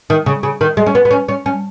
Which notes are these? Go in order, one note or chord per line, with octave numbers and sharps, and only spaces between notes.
D#3
C#3
C#3
D#3
G#3
C#4
B3
B3
C#4
C#4
C#4